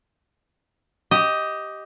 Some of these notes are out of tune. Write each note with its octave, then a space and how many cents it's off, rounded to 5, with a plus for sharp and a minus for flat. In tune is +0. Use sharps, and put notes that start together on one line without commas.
G4 -5 D#5 +10